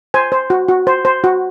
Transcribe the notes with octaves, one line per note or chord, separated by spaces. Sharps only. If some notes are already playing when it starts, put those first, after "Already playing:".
C5 G#5
C5
F#4
F#4
C5
C5
F#4